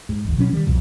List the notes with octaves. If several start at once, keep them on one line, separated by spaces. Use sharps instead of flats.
G#2
G1 D#2
B2 F#3 A#3 C#4
D#3 G3
C2 F2 B2